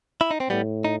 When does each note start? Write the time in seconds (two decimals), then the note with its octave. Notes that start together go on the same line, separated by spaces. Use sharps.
0.21 E4
0.31 D#4
0.40 C4
0.50 A2 G3 B3
0.85 D#4